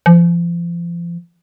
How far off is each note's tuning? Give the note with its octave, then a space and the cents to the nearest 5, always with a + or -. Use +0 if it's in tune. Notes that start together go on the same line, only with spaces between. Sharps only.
F3 -35